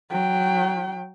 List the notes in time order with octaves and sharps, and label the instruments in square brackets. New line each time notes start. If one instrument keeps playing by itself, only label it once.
[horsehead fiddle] F#3 G5